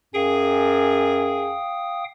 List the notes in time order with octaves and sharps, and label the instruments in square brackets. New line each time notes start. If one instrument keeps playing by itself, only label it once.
[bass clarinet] F#2 [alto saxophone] G#4 [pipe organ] F5 G5 D#6